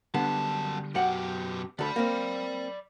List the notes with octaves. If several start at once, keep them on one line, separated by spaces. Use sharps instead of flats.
F#2 D3 G3 B3 A5
F#2 B2 G4 F#5
D2 A4 D5 B5
A#3 C4